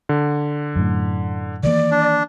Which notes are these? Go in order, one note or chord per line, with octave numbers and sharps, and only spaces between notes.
D3
F#2 A2
D#3 E3 A#3 D5
D4